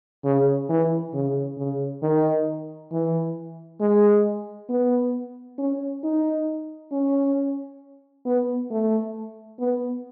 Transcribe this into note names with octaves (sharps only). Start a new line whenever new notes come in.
C#3
E3
C#3
C#3
D#3
E3
G#3
B3
C#4
D#4
C#4
B3
A3
B3